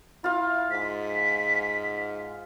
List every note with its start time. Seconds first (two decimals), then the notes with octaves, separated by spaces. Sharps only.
0.24 E4 F4 F5
0.71 G#2 B6